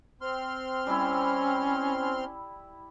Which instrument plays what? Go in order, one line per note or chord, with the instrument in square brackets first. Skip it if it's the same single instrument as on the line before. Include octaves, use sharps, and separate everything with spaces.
[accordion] C4 C6 F6
[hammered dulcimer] G3 E4 [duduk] C#4